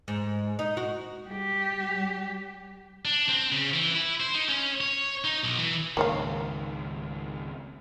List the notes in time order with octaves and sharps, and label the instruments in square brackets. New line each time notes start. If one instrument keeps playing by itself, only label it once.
[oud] G#2
D#4
F#4
[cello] G3 G4
[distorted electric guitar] D4
C4
C#3
E3
E4
C5
D#4
C#4
C#5
D#4
B1
E3
[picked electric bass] C#2 G#2 D#3 [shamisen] A#3 C#5 F5